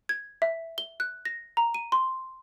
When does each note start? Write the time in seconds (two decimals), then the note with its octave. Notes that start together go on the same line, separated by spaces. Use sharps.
0.09 G#6
0.42 E5
0.78 G7
1.00 F#6
1.25 A#6
1.57 A#5
1.74 D#7
1.92 C6